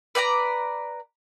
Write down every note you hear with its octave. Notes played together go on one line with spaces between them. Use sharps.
B4 D5 G5 A#5